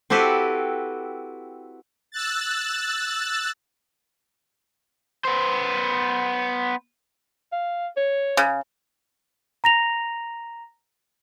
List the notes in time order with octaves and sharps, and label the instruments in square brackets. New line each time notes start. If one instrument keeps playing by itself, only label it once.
[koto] C4 E4 F#4 G4 A4 B4
[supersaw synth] E6 F#6 A6
[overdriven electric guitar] B3 C5
[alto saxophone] F5
C#5
[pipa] C#3
[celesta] A#5 A#6 F7